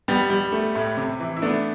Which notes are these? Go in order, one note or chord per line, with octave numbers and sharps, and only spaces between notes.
G3 B3
G3
A3
A2
C3
E3
E4
A3 B3 D4